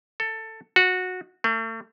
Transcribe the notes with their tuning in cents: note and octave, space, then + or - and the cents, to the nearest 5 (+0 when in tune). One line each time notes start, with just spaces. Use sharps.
A4 +15
F#4 -15
A3 +40